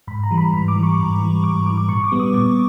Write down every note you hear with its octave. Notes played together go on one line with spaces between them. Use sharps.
G#2 B5
A#5
E3 G3
B5
G#2 B5
D6
E3 G3
C#6
G#2
E3 G3
G#2 D6
E3 G3 D6
D6
A#2 C#6
D6
G3 B3
D#6
A#2 D6